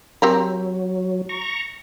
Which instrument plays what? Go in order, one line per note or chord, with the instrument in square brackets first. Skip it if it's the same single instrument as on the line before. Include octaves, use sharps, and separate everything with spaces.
[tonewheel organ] F#3 [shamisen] C4 G4 A#4
[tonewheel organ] A#5 C#6